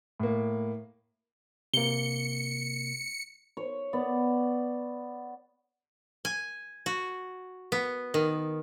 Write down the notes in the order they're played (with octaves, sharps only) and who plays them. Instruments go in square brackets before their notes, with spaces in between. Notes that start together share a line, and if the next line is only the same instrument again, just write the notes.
[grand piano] A2 A#3
[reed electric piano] C3 A#3 [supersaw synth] C#7 [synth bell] G7
[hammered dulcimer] C#5
B3 D5
[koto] G#5
F#4
B3
D#3